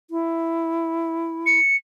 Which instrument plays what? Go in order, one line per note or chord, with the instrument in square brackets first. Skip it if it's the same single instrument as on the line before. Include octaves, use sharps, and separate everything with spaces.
[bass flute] E4
[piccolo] C#7